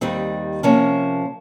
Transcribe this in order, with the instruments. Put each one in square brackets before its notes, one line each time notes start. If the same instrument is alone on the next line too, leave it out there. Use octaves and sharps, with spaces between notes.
[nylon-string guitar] D#2 D#3 G3 C4 D#4
C3 F3 A#3 C#4